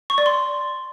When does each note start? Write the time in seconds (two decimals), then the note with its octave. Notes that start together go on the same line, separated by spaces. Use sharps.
0.10 C#6
0.18 D5
0.26 C6